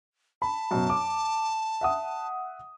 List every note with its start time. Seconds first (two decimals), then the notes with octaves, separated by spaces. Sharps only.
0.42 A5 B5
0.71 F#2 B2
0.90 D6
1.81 E5 F#5 D#6